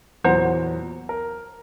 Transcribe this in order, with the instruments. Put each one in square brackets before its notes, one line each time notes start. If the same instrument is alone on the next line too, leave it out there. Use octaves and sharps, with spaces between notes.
[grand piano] E2 A#2 F#3 [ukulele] C5 F#5 A#5
[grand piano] A#4